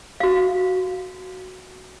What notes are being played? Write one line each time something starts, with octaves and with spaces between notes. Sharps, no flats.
F#4 F5